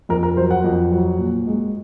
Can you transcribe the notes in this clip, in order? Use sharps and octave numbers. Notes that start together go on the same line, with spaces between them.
F2 A#4
A#4
F#3 C5
F#5
F2
F#3
A#2
G#3